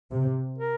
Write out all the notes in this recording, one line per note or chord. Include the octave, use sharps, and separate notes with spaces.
C3
A#4